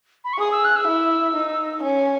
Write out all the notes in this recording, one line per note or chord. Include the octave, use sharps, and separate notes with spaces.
B5
C#6
G#4 D#6
E6
F#6
E6
E4
D#4
C#4